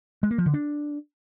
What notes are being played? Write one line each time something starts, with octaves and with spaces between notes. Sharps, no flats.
G#3
A#3
F3
D3
D4